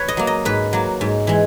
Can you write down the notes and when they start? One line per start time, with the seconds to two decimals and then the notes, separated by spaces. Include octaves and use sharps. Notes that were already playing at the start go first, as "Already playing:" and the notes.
Already playing: B4 C#5
0.08 D#5
0.17 F#3 A#3
0.27 D#5
0.45 G#2 B4
0.73 F#3 A#3
1.01 G#2
1.27 E3 G#3